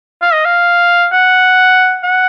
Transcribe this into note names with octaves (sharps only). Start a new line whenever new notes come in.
F5
D#5
F5
F#5
F#5